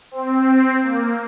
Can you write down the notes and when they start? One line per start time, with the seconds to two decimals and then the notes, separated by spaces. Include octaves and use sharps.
0.11 C4
0.83 A#3